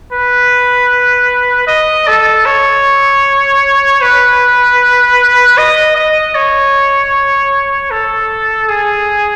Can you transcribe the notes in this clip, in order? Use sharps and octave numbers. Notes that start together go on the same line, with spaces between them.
B4
D#5
A4
C#5
B4
D#5
D#5
C#5
A4
G#4